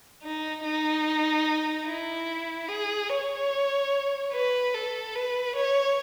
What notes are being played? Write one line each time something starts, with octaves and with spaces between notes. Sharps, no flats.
D#4
D#4
E4
G#4
C#5
B4
A4
B4
C#5